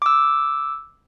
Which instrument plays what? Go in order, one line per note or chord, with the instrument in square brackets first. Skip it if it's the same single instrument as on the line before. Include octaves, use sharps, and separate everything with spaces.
[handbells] D6 E6